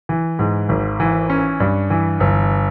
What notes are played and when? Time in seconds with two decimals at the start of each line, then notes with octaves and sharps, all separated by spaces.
0.09 E3
0.39 G#2
0.69 G#1
1.00 E3
1.30 C#4
1.60 G2
1.90 E3
2.20 G1